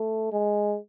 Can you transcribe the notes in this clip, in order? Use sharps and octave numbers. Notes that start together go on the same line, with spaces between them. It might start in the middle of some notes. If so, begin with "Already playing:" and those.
Already playing: A3
G#3